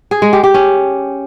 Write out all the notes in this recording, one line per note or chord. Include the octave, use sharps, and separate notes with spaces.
G#4
G#3
G4
G4
C#4